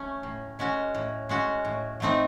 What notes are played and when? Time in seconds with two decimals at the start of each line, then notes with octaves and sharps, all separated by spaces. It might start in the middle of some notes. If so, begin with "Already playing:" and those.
Already playing: F#3 A3 C#4
0.23 A2
0.59 G#3 C#4 F#4
0.95 A2
1.29 G#3 C#4 F#4
1.65 A2
2.00 F#3 A3 C4 D#4